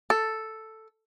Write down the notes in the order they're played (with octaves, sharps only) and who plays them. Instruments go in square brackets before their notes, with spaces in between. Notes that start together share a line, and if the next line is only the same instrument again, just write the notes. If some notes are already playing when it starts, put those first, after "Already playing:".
[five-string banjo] A4